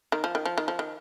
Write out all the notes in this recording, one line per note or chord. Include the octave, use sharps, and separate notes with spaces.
D#3
F3
D#3
F3
D#3
F3
D#3